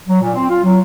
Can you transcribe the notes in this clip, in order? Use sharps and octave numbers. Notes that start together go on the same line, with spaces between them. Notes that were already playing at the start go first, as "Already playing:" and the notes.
F#3
A#2
C4
F4
F#3